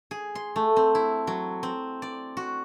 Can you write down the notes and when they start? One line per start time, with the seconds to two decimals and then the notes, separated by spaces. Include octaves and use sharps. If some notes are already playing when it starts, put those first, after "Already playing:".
0.11 G#4
0.35 C6
0.56 A3
0.76 C4
0.95 E4
1.27 F#3
1.63 C4
2.02 D5
2.37 F#4